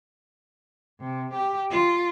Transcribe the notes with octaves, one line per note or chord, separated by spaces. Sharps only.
C3
G4
F4